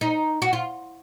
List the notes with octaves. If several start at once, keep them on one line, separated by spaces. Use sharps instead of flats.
D#4
F#4
F4